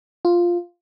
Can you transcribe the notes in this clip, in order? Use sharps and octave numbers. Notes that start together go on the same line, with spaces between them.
F4